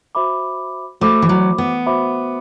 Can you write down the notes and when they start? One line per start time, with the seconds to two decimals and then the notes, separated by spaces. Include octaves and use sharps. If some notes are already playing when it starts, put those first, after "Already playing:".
0.15 F#4 C5 E5 B5 D6
1.01 A3 F#4 C5 E5 B5 D6
1.22 E3
1.29 F#3
1.58 B3
1.86 F#4 C5 E5 B5 D6